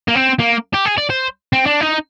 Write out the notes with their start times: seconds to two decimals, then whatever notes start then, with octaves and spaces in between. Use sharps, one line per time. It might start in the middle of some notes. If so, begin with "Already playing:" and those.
0.08 A#3
0.16 C4
0.40 A#3
0.74 G4
0.86 G#4
0.98 D5
1.10 C5
1.53 C4
1.66 D4
1.81 D#4